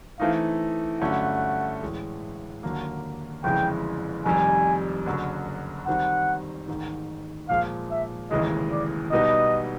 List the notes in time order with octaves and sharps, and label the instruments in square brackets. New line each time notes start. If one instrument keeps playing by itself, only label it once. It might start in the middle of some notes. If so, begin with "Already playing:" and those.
[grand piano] E3 A3 C4 D#4 [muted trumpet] F5
[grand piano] G2 D3 F#3 A3 C#4 [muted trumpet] F#5
[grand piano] A2 E3 G#3
D#2 D3 F#3 A#3
[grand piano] G1 F2 C#3 E3 G#3 [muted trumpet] G5
[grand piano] F1 F2 C3 D#3 G3 [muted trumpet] G#5
[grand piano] F#1 F#2 D3 F#3
[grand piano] D#3 G3 C4 D#4 [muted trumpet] F#5
[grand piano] A1 G#2 D#3
[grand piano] A#2 F3 G#3 [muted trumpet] F5
[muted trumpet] E5
[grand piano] F1 D#2 C#3 E3 G#3 [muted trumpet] D#5
[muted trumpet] D5
[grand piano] B1 B2 G3 B3 D#4 [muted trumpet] D#5